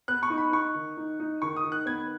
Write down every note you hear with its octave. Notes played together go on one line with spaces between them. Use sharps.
B3 F#6
C#6
D#4
B5
D#4 C#6
D#3
D#4
D#4
D#3 C#6
D#6
D#3
F#6
B3 G#6